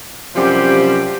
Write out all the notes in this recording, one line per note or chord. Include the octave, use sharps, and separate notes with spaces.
F#2 C3 F3 G3 G4 C5